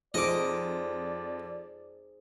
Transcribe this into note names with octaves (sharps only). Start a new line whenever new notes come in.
F2 D#4 G#4 C5 D5 D#5 D6